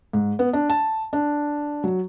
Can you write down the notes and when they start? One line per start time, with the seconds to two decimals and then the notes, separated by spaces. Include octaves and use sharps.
0.13 G#2
0.39 B3
0.53 D4
0.70 A5
1.13 D4
1.84 F#3